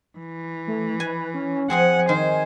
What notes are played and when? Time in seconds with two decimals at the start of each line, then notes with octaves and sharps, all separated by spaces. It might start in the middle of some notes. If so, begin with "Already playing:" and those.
0.18 E3
0.67 A3
1.00 B4 G#5
1.34 C#4
1.70 F3 C4 G#4 C5 F#5 G#5
2.09 D#3 C5